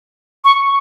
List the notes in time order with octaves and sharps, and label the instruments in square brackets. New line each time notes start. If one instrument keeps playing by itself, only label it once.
[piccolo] C#6